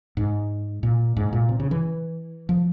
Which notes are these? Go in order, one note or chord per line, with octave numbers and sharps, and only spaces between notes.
G#2
A#2
G#2
A#2
C3
C#3
E3
F3